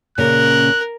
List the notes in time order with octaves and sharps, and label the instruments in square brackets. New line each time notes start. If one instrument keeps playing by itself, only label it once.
[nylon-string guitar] A#2 C#3 C#4 [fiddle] A#4 [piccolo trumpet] F#6